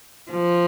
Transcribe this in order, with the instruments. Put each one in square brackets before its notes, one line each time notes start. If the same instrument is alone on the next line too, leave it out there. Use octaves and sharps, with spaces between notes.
[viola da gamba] F3